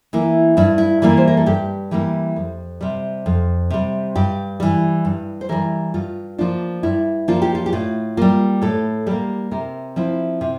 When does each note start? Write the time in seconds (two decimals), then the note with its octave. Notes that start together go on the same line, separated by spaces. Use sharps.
0.13 E3 A#3 E4
0.57 G2 E4
0.78 E4
1.02 E3 G3 A#3 E4
1.17 C5
1.28 A#4
1.37 A4
1.46 G2 G4
1.91 E3 G3 A#3 E4
2.36 F2
2.81 C3 G3
3.26 F2
3.70 C3 G3
4.15 G2 G4
4.60 E3 G3
5.05 G2
5.41 C5
5.49 E3 G3 A#4
5.94 G2 F4
6.38 F3 A#3 D4 F4
6.83 G2 E4
7.28 F3 A#3 D4 F4
7.42 G4
7.55 F4
7.66 G4
7.72 A2 F4
8.17 G3 A#3 F4
8.62 A2 A4
9.06 G3 A#3 G4
9.51 C3 A#4
9.96 F3 C4 E4
10.41 C3